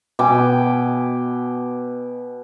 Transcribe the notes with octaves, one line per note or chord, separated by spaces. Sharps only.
B2 G5 G#5 D6